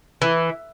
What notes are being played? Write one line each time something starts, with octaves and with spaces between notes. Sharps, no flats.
E3